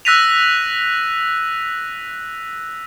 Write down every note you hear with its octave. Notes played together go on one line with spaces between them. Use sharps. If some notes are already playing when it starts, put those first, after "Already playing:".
E6 F#6 A#6 B6 D#7 F7